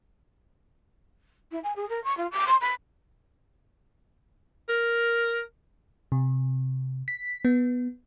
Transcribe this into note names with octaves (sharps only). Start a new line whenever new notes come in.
E4
G#5
G#4
A#4
C#6
F4
D6
C6
B5
A#4
C3
B6
B3